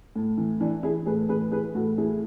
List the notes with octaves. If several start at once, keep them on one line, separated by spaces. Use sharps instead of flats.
A2
E3
E3 D4
E3 E4 G#4
A2 G#4 B4
E3 G#4 B4
E3 G#4 B4
A2 F#4 A4
E3 E4 G#4